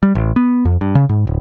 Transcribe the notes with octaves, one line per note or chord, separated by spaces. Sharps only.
G3
A1
B3
F2
G2
C#3
G#2
D1